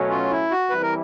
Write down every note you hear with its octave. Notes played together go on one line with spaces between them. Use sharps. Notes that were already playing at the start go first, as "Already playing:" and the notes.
Already playing: B2 F#3 A3 C#4
F4
E4
F#4
E3 G3 C4 E4 B4
A#4